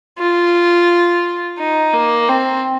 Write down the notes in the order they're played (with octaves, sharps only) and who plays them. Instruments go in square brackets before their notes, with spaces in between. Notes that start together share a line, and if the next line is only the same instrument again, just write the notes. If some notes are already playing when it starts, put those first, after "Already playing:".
[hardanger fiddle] F4
D#4
A#3
C4